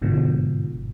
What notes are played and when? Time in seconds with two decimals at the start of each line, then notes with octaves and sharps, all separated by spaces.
0.01 G1 G#2 B2 D3 F3